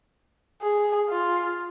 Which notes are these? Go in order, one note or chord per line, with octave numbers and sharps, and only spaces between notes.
G#4
F4